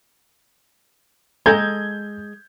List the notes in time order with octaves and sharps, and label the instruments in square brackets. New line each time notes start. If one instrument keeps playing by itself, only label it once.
[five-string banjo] G#3 A4 A#5 [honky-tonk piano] G6 G#6